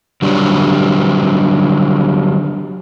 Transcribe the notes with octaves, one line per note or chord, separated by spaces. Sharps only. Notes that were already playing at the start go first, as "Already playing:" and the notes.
D3 F#3 G3 D4